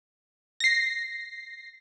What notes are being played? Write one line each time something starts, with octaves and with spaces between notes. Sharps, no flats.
A#6 C7